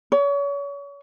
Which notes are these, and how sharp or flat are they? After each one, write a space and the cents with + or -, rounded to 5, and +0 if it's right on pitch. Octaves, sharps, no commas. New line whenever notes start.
C#5 +35